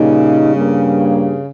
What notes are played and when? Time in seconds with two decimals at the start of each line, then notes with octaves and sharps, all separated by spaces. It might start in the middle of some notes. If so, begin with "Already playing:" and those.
Already playing: A#2 C#3 G3 A#3 D#4
0.55 G2 G3 A#3